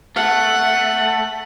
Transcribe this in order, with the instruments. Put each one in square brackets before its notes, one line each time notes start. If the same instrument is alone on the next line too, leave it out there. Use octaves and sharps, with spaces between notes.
[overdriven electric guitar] A3 [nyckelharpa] F#5